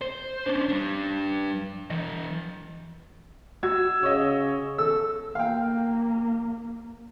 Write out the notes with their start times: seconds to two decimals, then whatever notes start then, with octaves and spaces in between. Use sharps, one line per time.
0.01 C5
0.46 C#4 D4
0.69 G3 D4
1.90 E3 D#5
3.63 F#4 E6 G#6
4.03 C#3 C#5 D#5
4.78 A4 E6
5.35 A#3 F5 G5